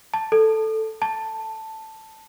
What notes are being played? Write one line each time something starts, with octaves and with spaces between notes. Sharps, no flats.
A5
A4
A5